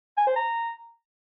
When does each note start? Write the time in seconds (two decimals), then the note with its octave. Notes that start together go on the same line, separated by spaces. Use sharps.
0.18 G#5
0.27 C5
0.36 A#5